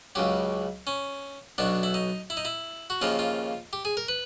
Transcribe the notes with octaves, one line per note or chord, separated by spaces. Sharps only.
C#2 C#3 F#3 G4
C#4
B1 B2 F#3 D4
E4
D#4
E4
D#4
E4
F#4
D#2 C#3 F3 A#3 F4
F4
G4
G#4
A#4
B4